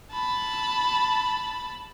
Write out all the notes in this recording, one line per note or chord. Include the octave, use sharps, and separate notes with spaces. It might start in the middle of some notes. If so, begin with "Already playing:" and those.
A5 B5